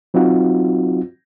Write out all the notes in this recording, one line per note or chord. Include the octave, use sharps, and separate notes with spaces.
F#3 C4 D#4 F4 F#4